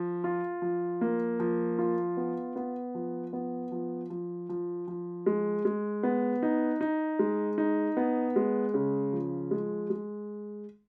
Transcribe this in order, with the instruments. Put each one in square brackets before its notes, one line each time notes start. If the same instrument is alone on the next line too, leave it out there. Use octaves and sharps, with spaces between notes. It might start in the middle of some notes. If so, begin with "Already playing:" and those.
Already playing: [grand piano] F3
F4
F3
A#3
F3
F4
B3
B3
F3
B3
F3
F3
F3
F3
G#3
G#3
B3
D#4
D#4
G#3
D#4
B3
G#3
C#3
F3
G#3
G#3